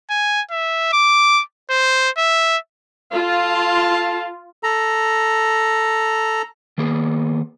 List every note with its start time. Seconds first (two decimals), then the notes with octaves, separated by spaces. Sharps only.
0.10 G#5
0.51 E5
0.93 D6
1.70 C5
2.18 E5
3.12 F4 A4 F5 A5
4.63 A4 A#5
6.78 D#3 A#3 B3 G#4